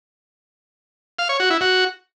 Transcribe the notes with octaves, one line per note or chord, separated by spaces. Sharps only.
F5
C#5
F#4
E4
F#4